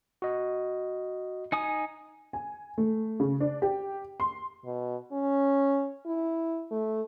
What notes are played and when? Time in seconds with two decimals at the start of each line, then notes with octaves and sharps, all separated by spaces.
0.22 F#4 D#5
1.52 D#4 G#5 D#6
2.33 G#5
2.78 A3
3.20 C#3
3.40 D4
3.62 G4
4.20 C6
4.65 B2
5.12 C#4
6.06 E4
6.71 A3